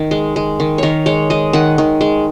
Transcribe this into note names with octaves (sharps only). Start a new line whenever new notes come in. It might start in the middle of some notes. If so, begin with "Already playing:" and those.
Already playing: D#3
G#3
G#3
D#3
D#3 A#4 C#5
G#3 C#5
G#3 D#5
D#3 F#5
D#3
G#3